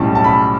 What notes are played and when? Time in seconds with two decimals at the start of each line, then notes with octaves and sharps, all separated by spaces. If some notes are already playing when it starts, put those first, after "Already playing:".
Already playing: B1 A2 G3 C#4 A5 C#6
0.15 A5
0.24 B5